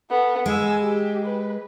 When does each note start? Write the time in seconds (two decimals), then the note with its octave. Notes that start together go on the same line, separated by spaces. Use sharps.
0.10 B3 A4
0.46 G#3 G#5 E6
0.83 G4
1.25 B4